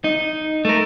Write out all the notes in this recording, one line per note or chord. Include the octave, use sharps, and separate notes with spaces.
D#4
A3 A#4